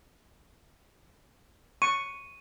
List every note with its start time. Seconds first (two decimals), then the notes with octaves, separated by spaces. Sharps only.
1.82 C#6 D#7